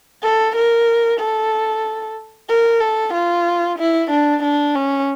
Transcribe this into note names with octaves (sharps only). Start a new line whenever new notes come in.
A4
A#4
A4
A#4
A4
F4
E4
D4
D4
C#4